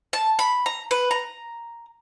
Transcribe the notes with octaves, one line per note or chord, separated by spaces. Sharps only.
A5
B5
A#5
B4
A#5